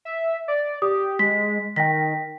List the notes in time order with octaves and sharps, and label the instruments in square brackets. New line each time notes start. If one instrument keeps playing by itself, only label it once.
[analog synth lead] E5
D5
[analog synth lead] G4 [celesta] D#6
[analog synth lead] G#3 [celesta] B6
[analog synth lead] D#3 [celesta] G5 A#6 B6